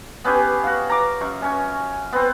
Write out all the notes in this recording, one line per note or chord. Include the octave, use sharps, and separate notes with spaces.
B3 C#4 G4 G#4
F#4 F5
A#5 D6
F#2 C#6
C#4 C#5 G#5
B3 C4